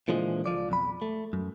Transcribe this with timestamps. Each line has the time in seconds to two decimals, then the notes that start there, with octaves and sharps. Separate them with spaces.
0.08 A#2 D3 E3 F3 G#3
0.46 C#2 F3 D5
0.69 B1 F2 B5
1.02 A3
1.33 F#2